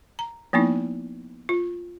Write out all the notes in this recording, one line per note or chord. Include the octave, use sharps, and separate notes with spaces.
A#5
F3 A#3 B3 D#4 E4
F4